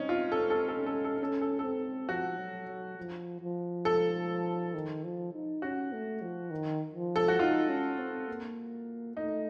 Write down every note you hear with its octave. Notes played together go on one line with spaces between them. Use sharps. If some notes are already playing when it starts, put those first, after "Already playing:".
Already playing: C4 C#4 D#4
F4
C4 A4
A4
A4
C#4
A4
A4
C#4 A4
A4
A4
C4
F3 F#4
F#3
F#3
F3
F3
A4
D#3
F3
D#4
C#4 F#4
A3
F3
D#3
F3
A4
F#4
D#4 F4
C#4
C4
A#3
A3 D#4